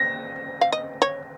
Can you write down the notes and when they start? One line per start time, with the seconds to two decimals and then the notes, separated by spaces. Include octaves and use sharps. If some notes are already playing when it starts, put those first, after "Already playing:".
Already playing: A#6
0.61 F5
0.72 D#5
1.02 C#5